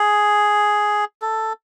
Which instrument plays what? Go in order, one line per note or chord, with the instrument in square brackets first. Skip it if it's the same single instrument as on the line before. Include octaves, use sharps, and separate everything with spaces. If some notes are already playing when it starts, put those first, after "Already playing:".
Already playing: [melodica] G#4
A4